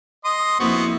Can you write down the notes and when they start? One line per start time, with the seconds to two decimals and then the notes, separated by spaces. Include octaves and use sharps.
0.25 D#5 C6 D#6
0.60 F2 A#3 B3 E4 F#4 C5